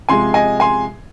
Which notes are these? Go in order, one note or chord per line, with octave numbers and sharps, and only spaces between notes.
C3 F3 G#3 G#5 C6
D#5 G#5
G#5 C6